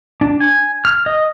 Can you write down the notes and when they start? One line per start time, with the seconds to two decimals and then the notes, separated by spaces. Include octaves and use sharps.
0.21 D4
0.40 G#5
0.85 F6
1.06 D#5